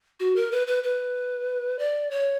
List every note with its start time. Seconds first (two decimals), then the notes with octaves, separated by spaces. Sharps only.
0.20 F#4
0.36 A#4
0.52 B4
0.67 B4
0.84 B4
1.79 D5
2.11 C#5